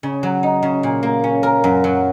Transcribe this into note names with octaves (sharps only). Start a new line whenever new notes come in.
C#3
F#3
D#4
C#3
A#2
A#3
C#4
A#4
F#2
F#3